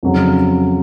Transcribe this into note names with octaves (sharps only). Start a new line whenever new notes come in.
F2 C#3 F#3